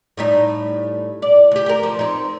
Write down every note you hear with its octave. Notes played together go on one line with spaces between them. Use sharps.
A2 G3 D#4
D5
D2 G4
G4 A#4
F3
C4 D#4